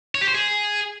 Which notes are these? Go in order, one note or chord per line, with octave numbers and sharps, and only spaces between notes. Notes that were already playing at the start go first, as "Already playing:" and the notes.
C#5
G4
C5
G#4